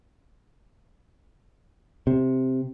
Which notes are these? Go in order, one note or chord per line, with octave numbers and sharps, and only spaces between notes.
C3